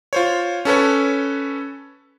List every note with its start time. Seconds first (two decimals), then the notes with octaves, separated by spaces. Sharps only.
0.13 F4 C5 C#5
0.65 C#4 A4 B4 C#5